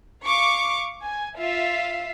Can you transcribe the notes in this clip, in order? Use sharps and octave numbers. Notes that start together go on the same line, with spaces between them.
F5 C#6 D6
G#5
F4 E5 F5